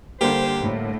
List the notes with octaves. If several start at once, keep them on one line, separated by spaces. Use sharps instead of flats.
D3 G3 A#3 D4 G4 C5
A2